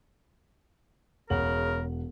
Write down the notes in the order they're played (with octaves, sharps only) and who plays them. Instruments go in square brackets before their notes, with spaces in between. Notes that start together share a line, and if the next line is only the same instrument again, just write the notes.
[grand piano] E1 F#5 F#7 [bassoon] C#3 [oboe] A#4